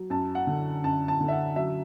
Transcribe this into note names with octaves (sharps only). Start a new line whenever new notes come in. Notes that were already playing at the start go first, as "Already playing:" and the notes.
Already playing: F#3
F#2 A5
F#5
D3
F#2 A5
A5
D3
E5
F#5
F#3 E5